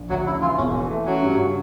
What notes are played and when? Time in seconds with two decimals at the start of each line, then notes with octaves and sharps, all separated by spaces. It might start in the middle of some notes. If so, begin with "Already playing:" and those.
Already playing: A#1
0.10 D2 F#3 F#4
0.26 C#3 E4
0.42 E3 F4
0.58 E1 C#4
0.75 E3
0.90 A3
1.06 F#3 C#4 F#4
1.22 G2
1.39 C#3